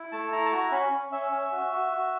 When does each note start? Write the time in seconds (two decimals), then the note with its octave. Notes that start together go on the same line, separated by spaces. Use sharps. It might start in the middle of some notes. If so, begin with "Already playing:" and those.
Already playing: E4
0.12 A3 A5
0.32 E4 A#5
0.46 A5
0.52 F#4 A#5
0.71 C#4 B5
0.91 C#4
1.12 C#4 E5
1.31 C#4
1.52 F#4
1.72 F#4
1.92 F#4